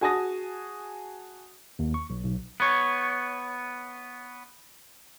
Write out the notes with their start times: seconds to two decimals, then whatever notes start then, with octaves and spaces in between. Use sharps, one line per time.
0.01 F#4 G#4 G#5 A5 D#6 A#6
1.79 D#2
1.94 C#6
2.10 B1
2.24 B1
2.60 B3 C#5